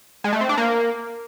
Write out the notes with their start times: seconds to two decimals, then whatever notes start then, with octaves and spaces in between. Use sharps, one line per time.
0.24 G#3
0.33 A3
0.41 C4
0.49 D4
0.57 A#3